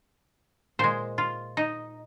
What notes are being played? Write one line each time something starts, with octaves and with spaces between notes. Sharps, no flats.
A#2 G#3 C5
F4
D#4